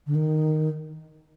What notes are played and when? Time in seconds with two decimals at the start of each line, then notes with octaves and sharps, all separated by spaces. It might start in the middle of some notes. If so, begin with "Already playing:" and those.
0.07 D3
0.15 D#3